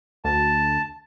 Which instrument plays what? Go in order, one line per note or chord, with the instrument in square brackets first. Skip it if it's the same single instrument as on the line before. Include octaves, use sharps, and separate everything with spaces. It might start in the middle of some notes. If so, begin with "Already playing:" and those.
[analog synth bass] D2 [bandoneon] A5